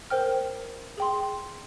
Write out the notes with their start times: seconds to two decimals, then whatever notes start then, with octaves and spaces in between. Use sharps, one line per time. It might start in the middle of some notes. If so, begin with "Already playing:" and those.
0.10 A#4 C5 G5 F6
0.98 G#4 G5 C6